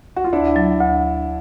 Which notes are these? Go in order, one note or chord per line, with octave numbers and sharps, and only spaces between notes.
F#4
F4
D2 D4 E4
F#3
D2